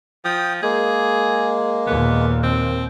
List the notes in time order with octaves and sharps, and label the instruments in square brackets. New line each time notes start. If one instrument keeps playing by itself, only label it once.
[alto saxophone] F3 [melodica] G5 D#6
[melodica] G#3 A#3 [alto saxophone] G#4
[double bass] D#2 A#2 [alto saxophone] B3
[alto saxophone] C4